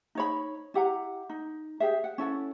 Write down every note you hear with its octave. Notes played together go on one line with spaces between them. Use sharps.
D#4 C#5 B5
E4 G4 F#5 A#5
D#4
G4 G#4 E5
F#5
C#4 E4 A4 F#5